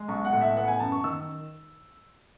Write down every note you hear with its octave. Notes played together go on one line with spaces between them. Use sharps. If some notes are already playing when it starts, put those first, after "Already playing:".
Already playing: G#3
B1 C#6
F#5
A2
E5
B3 F#5
G#5
F#2 A5
C#6
D#3 E6